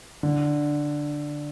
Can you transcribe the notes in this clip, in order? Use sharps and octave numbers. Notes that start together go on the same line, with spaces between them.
D3